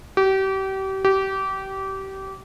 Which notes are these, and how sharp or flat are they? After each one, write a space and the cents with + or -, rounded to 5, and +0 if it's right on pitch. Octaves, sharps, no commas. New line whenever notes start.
G4 -35
G4 -25